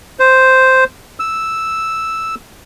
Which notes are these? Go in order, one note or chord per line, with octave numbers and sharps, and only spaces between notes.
C5
E6